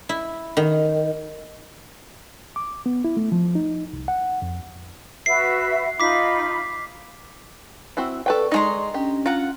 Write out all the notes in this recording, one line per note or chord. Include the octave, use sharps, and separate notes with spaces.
E4
D#3
D6
B3
E4
A3
F3
D#4
C2
F#5
F2
F#4 B4 E5 C7
D#4 F4 B5 D6 B6
C4 E4 F#4
A4 B4 D5 G5 C#6
G#3 D#4 D#5 A#5 C6
C#4 D4 G4
F4 F#5 A#5